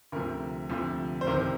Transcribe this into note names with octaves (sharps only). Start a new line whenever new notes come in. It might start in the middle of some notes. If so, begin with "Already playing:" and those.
D2 C3 F3 A#4
D2 C3 F3
C5
C2 C3 D#3 A#4